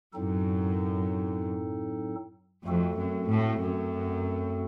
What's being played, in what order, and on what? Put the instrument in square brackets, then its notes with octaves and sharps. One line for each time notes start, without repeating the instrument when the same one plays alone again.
[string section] F#2 [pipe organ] A2 F#3 C4 D#4 A4
[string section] F2 [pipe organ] A3 C4 F#4 A4
[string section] F#2
A2
F#2